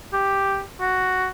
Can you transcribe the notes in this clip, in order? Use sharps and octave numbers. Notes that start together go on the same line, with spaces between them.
G4
F#4